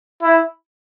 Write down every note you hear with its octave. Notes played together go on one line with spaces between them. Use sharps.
E4